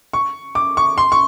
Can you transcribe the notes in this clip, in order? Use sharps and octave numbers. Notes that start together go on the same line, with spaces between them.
C#6
D6
C#6
C6
C#6